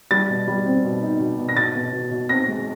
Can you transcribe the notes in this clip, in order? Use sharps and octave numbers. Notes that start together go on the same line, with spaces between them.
G3 A6
B2
G3
C4
B2
D#4
B2
B2
A#6
B2 A6
B2
B2
B2
C4 A#6
G#3